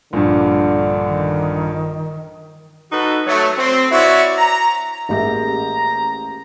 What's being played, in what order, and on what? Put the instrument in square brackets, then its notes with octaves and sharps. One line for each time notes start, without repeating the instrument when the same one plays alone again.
[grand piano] A#1 G2 [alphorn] D3
[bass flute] D#3
[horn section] D#4 F#4 A4 B4
F#3 A3
C4
E4 F#4 C#5 D5 E5
A#5
[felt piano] A1 G4 E5 [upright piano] G#3 A#3 C#4 [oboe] A#5